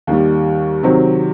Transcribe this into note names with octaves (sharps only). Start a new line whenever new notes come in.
D#2 D#3 G3
C3 D#3 F#3 C4